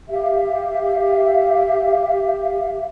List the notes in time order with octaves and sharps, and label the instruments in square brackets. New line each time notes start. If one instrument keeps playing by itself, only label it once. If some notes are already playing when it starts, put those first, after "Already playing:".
[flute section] G4 E5 F5